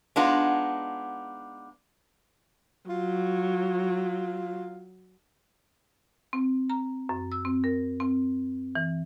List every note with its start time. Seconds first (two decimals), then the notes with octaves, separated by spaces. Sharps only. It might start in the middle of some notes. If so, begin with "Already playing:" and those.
0.16 G#3 B3 D4 D#4 F4
2.90 F#3 F4
6.33 C4
6.70 A#5
7.09 F#2
7.32 E6
7.45 C4
7.64 A#4
8.00 C4
8.75 E3